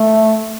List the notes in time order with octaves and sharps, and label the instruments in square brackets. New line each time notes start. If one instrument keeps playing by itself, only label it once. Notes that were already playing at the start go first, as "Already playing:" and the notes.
Already playing: [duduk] A3